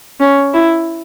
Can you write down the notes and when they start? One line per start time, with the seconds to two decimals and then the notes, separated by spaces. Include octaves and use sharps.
0.20 C#4
0.54 E4